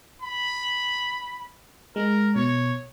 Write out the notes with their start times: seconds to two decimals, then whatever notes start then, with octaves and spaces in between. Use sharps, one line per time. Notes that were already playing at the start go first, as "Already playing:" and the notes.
0.22 B5
1.96 G#3 A#4
2.35 B2 C#5